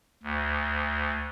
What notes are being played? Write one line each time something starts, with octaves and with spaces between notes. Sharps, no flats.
D2